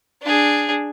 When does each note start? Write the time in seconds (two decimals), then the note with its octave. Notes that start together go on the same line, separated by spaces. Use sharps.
0.22 D4 G#4